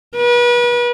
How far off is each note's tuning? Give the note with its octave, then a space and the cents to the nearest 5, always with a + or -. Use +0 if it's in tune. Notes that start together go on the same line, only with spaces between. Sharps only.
B4 -35